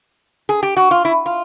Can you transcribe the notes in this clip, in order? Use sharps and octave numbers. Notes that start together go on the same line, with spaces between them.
G#4
G4
F#4
F4
E4
F4